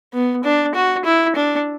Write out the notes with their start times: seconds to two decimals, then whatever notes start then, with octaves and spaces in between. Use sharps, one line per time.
0.13 B3
0.44 D4
0.75 F#4
1.05 E4
1.36 D4